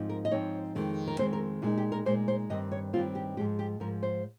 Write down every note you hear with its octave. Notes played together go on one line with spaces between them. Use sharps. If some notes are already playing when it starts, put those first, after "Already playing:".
Already playing: G#2 F3 C4 D#4
A#4
D#5
G#2 F3 C4 D#4 C#5
F2 D#3 G#3 C4
A#4
F2 D#3 G#3 C4 C5
A#4
A#2 G#3 D#4 F4
G4
A#4
A#2 G#3 D#4 C5
C5
G2 D#3 G3 C4 D#5
C#5
G2 D#3 G3 C4 F4
G4
G#2 F3 G#3 G4
G4
G#2 F3 G#3 A#4
C5